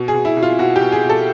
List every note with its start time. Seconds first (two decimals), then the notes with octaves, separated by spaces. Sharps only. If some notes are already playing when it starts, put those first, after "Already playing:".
Already playing: B2
0.08 G#4
0.14 B2
0.25 E4
0.37 B2
0.43 F4
0.59 B2 F#4
0.76 G4
0.81 B2
0.92 G#4
1.03 B2
1.10 A4